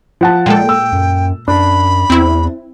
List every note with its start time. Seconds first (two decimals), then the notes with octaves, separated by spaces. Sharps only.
0.21 F3 F#5 A5
0.46 A#2 G#3 A4 G5
0.69 E6
0.92 F#2
1.48 F#2 D4 B5
2.10 E2 C4 E4